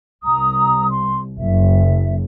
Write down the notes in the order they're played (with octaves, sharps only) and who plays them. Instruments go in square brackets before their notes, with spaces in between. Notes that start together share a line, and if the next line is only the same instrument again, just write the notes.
[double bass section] C2 [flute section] A#5 D#6
[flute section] C6
[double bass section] F#1 [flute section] E5